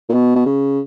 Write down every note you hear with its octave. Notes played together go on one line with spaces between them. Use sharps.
A#2
B2
B2
C#3